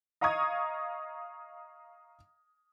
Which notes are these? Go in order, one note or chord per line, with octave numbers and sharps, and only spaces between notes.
D#5 F5 A#5 C#6 D#6 G#6